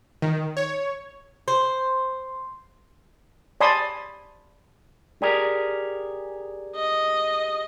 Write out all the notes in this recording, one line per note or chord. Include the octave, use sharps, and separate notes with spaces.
D#3
C#5
C5
D5 G#5 A5 B5 C6 D#6
G4 G#4 A#4 D5 G#6
D#5